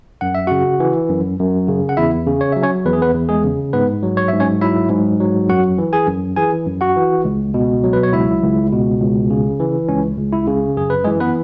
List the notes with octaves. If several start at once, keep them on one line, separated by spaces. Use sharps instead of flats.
F#2 F#5
E5
C#3 F#4 F#5
E3
F#2
F#2
C#3
F#5
E2 E4 E5
C#3
C#5
F#3 E5
C#4 C#5
E2 B4
G#4
B3 B4
E2
G#3 G#4
C#3
G#2 B3 B4
F#3
C#5
G#2 E5
C#4 C#5
F#3 E4 E5
G#2
F#3
F#2 F#4 F#5
E3
G#4 G#5
F#2
E3 G#4 G#5
F#2
F#4 F#5
E3
C#2
B2
F#3
B4
C#5
C#2 E4 E5
C#2
B2
C#2
C#3
E3
C#2 C#4
C#2
E4
C#3
F#2 G#4
B4
E3 G#3 G#4
B3 B4